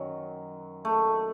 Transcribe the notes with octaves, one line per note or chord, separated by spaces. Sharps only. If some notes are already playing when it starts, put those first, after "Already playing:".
Already playing: F#2 D#3 F#3
A3